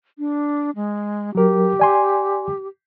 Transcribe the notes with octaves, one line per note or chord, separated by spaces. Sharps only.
D4
G#3
F#3 G4 A#4
D5 G#5 C6